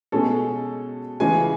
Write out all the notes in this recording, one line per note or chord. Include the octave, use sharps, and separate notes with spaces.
B2 G#3 C#4 A4
C#3 E3 G#3 C#4 G#5